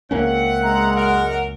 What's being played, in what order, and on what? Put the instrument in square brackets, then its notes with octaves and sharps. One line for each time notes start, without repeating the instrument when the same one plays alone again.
[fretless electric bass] C#2 A#3 C#4 [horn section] C4 E5 F#5
[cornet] G#3 [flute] A#5
[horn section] F#2 A#4 [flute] F#5